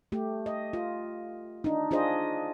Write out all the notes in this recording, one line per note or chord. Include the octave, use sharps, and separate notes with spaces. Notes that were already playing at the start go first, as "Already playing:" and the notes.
A3 G4
D#5
F4
D4 D#4
D4 F4 G#4 C5 D#5